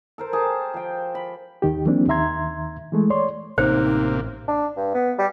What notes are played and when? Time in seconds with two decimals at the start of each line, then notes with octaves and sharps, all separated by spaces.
0.18 A4 A#4 C5
0.32 G4 G#4 A5
0.74 F3 G5
1.15 B5
1.62 D#2 D#3 G4
1.86 E3 F#3 A#3 C4 D4
2.08 D#2 D#3 E5 A#5 C6 G#6
2.92 E3 G#3 A3
3.10 C#5 D5 C6
3.58 A1 C3 A#3 D#4 C5
4.48 D4
4.76 G2
4.94 B3
5.18 G3